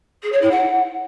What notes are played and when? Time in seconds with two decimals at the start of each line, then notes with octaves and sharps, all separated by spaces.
0.22 G#4
0.32 C#5
0.41 E4
0.51 F#5